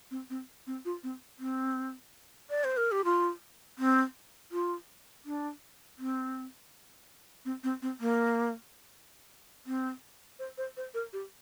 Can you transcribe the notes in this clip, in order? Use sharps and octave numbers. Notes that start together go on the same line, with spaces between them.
C4
C4
C4
F4
C4
C4
D5
C5
A#4
G4
F4
C4
F4
D4
C4
C4
C4
C4
A#3
C4
C5
C5
C5
A#4
G4